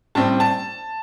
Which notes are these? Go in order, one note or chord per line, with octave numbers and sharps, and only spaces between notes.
A2 G3 C4 A5
A5